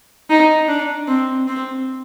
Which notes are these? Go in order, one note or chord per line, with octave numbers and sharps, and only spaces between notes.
D#4
D4
C4
C4